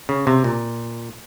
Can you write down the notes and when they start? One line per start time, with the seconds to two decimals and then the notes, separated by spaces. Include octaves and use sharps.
0.09 C#3
0.27 C3
0.44 A#2